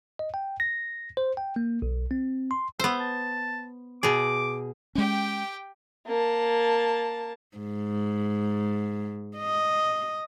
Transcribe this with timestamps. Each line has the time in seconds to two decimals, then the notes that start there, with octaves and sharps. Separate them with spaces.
0.19 D#5
0.34 G5
0.60 A#6
1.17 C5
1.37 G5
1.56 A#3
1.82 B1
2.11 C4
2.51 C6
2.79 B3 C5 E5
3.00 A5
4.03 B2 G#4 D6
4.95 G#3 C#4 G4 G5
6.06 A#3 A5
7.57 G#2
9.38 D#5